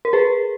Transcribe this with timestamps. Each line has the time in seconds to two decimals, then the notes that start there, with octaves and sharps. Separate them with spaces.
0.05 A#4
0.13 G#4 B4